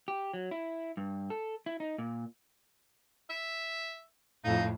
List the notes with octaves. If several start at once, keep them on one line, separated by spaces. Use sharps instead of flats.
G4
F#3
E4
G2
A4
E4
D#4
A#2
E5
F2 A2 D#4 F5